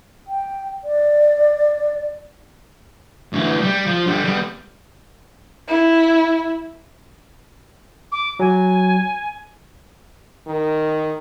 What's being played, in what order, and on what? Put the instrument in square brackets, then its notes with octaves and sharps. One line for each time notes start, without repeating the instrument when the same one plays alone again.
[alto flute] G5
D5
[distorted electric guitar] D2 E3
G3
F3
D3 G3
G3 B3
[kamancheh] E4
[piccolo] D6
[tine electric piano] F#3 [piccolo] G#5
[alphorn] D#3